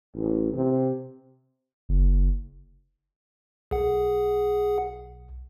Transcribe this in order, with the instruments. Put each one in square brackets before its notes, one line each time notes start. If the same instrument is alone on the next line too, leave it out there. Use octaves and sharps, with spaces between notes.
[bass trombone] A1
C3
[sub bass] F#1
[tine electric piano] B1 [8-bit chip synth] G#4 F#5